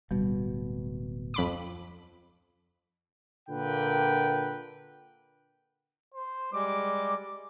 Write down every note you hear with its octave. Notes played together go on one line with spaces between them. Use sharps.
D1 B2 G3
F2 B5 D6
A#2 D3 A#3 B4 G5
C5
G3 G#3 D6